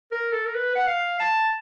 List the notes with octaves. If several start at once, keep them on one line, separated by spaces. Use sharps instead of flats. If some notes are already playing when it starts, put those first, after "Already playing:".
A#4
A4
A#4
B4
F#5
F5
A5